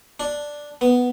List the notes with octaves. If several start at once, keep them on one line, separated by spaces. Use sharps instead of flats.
D4
B3